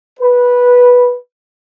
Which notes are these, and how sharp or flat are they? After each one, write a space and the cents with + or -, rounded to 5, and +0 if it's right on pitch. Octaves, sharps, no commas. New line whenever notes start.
B4 -10